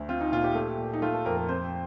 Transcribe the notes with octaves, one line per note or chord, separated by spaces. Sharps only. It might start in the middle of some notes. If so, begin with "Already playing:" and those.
Already playing: D2
C4 F4
D#4
A#2 F4
G4
A3
A#2
D#4
A3 F4
A4
F2 A#4
A#4
C4 C5